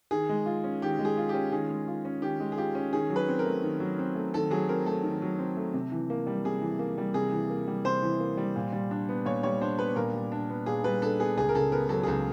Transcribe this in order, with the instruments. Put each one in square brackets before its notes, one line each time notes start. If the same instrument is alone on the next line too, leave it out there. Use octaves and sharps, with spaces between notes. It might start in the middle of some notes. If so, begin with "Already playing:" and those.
[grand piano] D#3 [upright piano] G#4
[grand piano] G#3
F4
C#4
[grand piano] D#3 [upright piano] G4
[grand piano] G#3
[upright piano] G#4
[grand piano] F4
[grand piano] C#4 [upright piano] G4
[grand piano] D#3 [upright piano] G#4
[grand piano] G#3
F4
C#4
[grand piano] D#3 [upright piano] G4
[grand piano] G#3
[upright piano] G#4
[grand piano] F4 [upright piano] G4
[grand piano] C#4
[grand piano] D#3 [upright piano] G#4
[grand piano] F#3
[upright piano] B4
[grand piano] C4
[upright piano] A#4
[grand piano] A3
D#3
F#3
C4
A3
[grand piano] D#3 [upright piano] A4
[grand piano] F#3 [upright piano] G#4
[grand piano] C4 [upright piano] A#4
[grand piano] A3 [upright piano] A4
[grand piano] D#3
F#3
C4
A3
C3
E3
A#3
G3
[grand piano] C3 [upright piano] G#4
[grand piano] E3
A#3
G3
[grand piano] C3 [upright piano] G#4
[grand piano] E3
A#3
G3
[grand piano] C3 [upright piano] C5
[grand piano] E3
A#3
G3
A#2
G3
D4
B3
[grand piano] A#2 [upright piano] C#5
[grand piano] G3 [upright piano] C#5
[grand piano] D4 [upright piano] C5
[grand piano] B3 [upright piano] B4
[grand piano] A#2 [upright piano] A#4
[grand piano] G3
D4
B3
[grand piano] A#2 [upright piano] G#4
[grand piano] G3 [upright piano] B4
[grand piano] D4 [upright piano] A4
[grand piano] B3 [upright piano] G#4
[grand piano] C#2 [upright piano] G#4
[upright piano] A#4
[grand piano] C#3 [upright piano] A4
[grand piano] B3 [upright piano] A#4
[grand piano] F#3 [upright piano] A4
[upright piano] G#4
[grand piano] C#2 [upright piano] A4